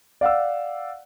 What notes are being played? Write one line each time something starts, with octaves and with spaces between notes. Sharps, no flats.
D5 F5 F#5 E6